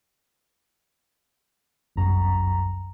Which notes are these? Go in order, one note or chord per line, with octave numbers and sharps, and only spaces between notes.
G1 C2 F#2 A#5